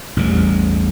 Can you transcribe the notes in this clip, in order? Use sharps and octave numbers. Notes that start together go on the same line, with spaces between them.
A1 E2 G#2 G3